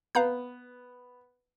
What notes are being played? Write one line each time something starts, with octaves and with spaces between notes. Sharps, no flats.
B3 F5 A#5 G6